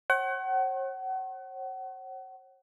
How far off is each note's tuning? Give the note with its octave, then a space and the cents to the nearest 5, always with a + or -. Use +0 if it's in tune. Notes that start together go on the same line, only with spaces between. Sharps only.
C#5 -45 F#5 +35